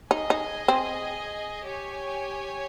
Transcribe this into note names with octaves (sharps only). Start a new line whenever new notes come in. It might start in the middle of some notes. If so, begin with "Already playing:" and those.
D#4 G#4 D#5 G#5
D#4
C4
G4 C#5 G#5